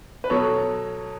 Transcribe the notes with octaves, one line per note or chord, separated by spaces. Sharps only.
B4
B2 F#3 A4 C#5